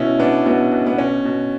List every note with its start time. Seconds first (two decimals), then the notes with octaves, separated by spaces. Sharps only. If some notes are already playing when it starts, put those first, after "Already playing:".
Already playing: B2 C#4 E4
0.19 B2 B3 D4
0.46 B2 B3
0.72 B2
0.86 B3
0.98 B2 C#4
1.25 B2